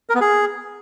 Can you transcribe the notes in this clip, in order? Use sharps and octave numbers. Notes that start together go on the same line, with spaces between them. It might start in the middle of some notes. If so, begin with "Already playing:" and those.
A#4
B3
G#4